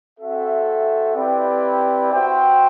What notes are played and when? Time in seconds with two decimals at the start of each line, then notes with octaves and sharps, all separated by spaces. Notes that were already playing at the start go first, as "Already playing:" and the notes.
0.19 C4 F#4 A4 E5
1.15 C4 E4 G4 B4 D5
2.11 F#4 C5 E5 G5